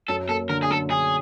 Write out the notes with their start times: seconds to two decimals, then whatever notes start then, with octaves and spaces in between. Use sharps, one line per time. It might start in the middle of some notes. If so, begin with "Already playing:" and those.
0.08 F#2 A4
0.28 A#3 A4
0.49 D3 A#4
0.63 G#4
0.70 F#2 A4
0.90 D3 G#4